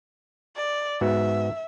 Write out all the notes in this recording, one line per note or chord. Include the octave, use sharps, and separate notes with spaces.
D5
G#2 B3 F#4 E5